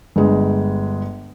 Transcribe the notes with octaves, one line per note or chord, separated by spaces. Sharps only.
G1 G#3